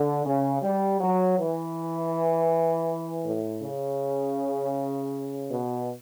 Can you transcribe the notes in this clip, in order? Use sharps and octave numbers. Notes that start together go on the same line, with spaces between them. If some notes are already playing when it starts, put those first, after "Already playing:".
Already playing: D3
C#3
G3
F#3
E3
A2
C#3
B2